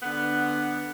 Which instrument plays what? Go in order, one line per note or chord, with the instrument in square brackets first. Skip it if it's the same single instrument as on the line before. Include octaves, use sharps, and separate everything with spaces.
[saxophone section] D3 B3